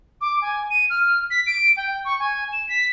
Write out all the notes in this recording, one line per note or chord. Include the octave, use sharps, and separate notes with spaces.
D6
G#5
D#7
F6
B6
D7
G5
C#6
G#5
E7
B6